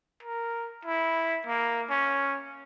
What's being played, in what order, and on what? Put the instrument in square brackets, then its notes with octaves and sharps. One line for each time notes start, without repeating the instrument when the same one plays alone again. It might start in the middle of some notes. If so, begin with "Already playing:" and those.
[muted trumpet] A#4
E4
A#3
C#4